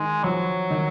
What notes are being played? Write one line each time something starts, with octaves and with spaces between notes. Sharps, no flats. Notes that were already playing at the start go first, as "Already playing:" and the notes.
Already playing: D#3 G#3
F3 F#3
D#3